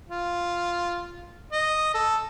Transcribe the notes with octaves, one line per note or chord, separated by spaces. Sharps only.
F4
D#5
A4